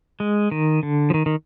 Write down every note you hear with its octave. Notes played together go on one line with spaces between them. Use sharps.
G#3
D#3
D3
F3
D#3
D#3